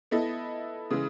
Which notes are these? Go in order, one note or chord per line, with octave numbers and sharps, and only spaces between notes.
B3 E4 A4 D#5
C#3 E3 G#3